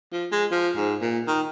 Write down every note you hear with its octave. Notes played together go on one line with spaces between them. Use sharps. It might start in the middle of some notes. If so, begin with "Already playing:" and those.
F3
G#3
F3
G#2
A#2
D#3